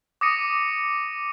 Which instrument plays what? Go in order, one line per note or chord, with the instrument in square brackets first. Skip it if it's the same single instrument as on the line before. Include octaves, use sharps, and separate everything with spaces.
[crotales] D6 D#6 A#6 C#7 D#7